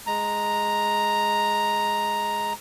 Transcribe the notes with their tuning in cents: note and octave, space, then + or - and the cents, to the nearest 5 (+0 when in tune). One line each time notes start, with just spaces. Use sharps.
G#3 +0 A#5 +0